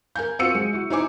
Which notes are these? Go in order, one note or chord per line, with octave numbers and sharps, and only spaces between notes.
A#4 G#5 G6
C4 F4 F#4 E6 C#7 D#7
G#3
E4 F#4
D#4 E4 C5 G#5 D6